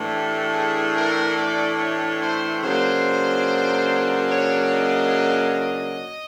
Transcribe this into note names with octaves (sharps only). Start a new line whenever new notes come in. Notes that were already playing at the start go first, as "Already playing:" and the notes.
Already playing: A2 E3 A3 D4
G4
G#4
A#4
D5
C#5
C5
C#3 F#3 A#3 D4 C5
C#5
D#5